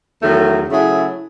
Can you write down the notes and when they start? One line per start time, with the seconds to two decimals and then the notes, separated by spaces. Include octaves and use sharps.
0.22 E2 D#3 F#3 A3
0.69 C#3 F#3 A3 E4 G#4